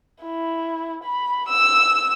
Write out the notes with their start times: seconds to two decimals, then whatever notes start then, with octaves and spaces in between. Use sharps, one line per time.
0.24 E4
1.04 B5
1.49 E6